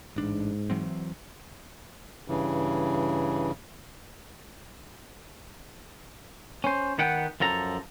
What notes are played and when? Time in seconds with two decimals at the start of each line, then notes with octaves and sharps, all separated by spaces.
0.16 A1 G#2 D4
0.70 E3 F#3 C4
2.28 G2 C#3 E3
6.64 C#4 C5
6.98 D#3 B3 F#5 G5
7.40 F#2 F3 A4 A#5